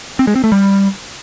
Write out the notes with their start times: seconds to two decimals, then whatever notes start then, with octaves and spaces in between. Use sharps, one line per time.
0.19 C4
0.27 G#3
0.36 C4
0.44 A3
0.52 G3